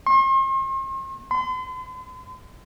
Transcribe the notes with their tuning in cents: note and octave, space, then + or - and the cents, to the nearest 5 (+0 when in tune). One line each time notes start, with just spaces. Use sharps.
C6 +45
C6 -40